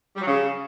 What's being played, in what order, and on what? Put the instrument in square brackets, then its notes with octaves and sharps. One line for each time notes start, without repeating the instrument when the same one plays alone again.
[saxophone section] G3
F#3
C#3